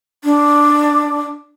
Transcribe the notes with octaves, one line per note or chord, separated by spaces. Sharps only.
D4